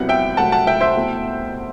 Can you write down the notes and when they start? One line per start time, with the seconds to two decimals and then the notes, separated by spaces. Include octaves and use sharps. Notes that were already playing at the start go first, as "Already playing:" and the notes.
Already playing: C2 C3 F#3 B3 E4 F#5
0.09 E5 G5
0.37 C2 C3 F#3 A3 F#5 A5
0.52 F#5 A5
0.67 E5 G5
0.80 C5 E5
0.96 B2 A3 E4